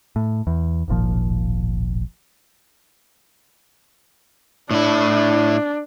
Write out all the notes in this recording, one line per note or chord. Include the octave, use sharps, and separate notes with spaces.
A2
E2
D1 G#1 A#2 F3
A2 D4 E4